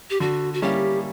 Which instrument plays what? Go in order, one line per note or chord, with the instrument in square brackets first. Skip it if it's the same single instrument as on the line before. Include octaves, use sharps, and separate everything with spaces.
[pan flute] G4
[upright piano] D3 [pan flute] F#4
[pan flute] F#4
[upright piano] G3 A#3 C#4 E4 [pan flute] G4